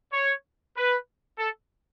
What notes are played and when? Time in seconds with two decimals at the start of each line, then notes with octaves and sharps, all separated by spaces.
0.13 C#5
0.76 B4
1.38 A4